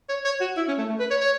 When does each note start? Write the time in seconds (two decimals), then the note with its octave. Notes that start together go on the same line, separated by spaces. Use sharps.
0.09 C#5
0.25 C#5
0.41 F#4
0.57 E4
0.68 C#4
0.79 A3
0.89 A3
1.00 B4
1.11 C#5
1.21 C#5